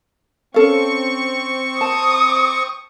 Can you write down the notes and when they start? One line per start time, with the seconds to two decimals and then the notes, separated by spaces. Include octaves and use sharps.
0.54 C4 C#4 A4 F5 C#6
1.81 A5 D#6